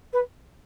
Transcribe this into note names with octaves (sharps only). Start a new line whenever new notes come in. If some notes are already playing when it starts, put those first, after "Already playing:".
B4